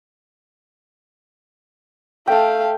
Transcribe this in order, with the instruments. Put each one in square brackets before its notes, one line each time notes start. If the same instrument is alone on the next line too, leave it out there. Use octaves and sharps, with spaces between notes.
[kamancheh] A3 F5 [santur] G5 A5